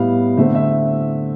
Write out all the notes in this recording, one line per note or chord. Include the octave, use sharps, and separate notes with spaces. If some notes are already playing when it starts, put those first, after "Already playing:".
Already playing: A2 G3 B3 F5
D3 A3 C4 E5
E5